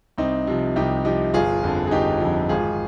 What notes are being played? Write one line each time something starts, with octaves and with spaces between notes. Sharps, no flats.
C2 C4 D#4
C3 F3
C2 D#4 G4
C3 F3 D#4 G4
G1 F4 G#4
F2 D3 F3
G#4
G1 D#4 G4
F2 D3 F3
G#1 F4 G#4